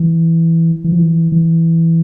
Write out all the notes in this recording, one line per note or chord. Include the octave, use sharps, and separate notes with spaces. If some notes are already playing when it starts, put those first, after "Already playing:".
Already playing: E3
E3
F3
E3
E3